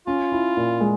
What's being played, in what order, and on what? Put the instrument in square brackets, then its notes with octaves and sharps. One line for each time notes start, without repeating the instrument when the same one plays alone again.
[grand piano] C#4 [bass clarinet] F4
[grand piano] E4
A#2
G#3